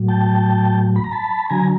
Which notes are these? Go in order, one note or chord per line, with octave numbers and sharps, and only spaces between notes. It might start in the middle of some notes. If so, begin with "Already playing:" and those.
Already playing: A2 F#3
G5 A5
B5
A#5
A5 B5
D3 F#3 G#5 A#5